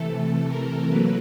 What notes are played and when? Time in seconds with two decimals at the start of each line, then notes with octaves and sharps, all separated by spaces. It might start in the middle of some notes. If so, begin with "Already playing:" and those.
Already playing: C3 E3 A3 A4
0.47 A#4
0.89 F#3 A#3 B4